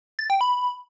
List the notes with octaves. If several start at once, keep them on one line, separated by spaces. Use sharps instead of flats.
A6
G5
B5